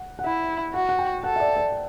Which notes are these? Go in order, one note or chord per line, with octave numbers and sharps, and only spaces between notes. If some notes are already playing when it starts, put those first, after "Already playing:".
Already playing: F#5
F#5
E4 E5
F#4 F#5
F#5
G5
A4 F#5
E5
D5
D5